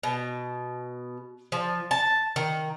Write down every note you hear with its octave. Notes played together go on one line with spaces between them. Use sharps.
B2
F3
A5
D#3